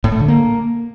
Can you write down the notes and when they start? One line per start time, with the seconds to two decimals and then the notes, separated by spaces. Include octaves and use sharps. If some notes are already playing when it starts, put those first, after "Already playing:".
0.04 A2
0.12 A3
0.20 D3
0.28 A#3